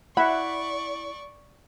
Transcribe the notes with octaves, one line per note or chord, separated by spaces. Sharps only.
E4 D5 E5 F#5 B5 C#6